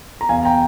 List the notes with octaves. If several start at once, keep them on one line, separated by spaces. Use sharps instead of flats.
A#5
E2 F5 G#5
G5 A#5